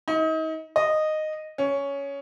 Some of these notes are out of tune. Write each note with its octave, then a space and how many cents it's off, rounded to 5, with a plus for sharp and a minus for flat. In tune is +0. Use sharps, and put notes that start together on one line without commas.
D#4 +35
D#5 -10
C#4 +10